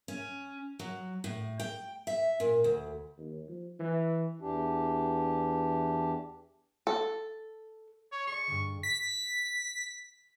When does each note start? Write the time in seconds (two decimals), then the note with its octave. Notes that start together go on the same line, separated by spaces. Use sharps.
0.08 C#4
0.79 F#3
1.24 A2
1.60 G5
2.07 E5
2.40 A#2
2.64 D2
3.18 D#2
3.49 F3
3.79 E3
4.41 E2 E3 D4 G4
6.87 A4
8.12 C#5
8.27 G#4 D5 C#6
8.47 G2 D3
8.83 B6